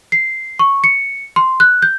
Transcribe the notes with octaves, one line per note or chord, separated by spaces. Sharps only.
C7
C#6
C#7
C6
F#6
G6